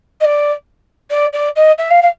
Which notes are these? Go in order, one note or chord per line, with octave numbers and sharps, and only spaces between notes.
D#5
D5
D5
D5
D#5
E5
F5
F5